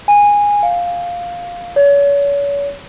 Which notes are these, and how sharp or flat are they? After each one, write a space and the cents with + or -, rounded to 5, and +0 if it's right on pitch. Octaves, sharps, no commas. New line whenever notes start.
G#5 -15
F5 +5
C#5 +35